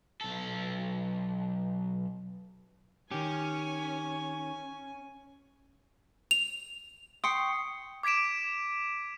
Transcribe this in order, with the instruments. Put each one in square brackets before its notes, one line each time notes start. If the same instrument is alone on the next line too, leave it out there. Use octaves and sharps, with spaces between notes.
[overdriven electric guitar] B1 A4
[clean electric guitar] D#3 G4 [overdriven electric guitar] C#4 [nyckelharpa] G#5
[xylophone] F7
[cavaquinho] G5 C6 C#6 [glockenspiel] D#6 C7 C#7
[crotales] D6 G#6 B6 D7 E7